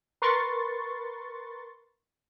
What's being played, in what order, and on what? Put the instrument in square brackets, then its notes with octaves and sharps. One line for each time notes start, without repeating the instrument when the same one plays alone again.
[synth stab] A#4 B4 C6 C#6 A6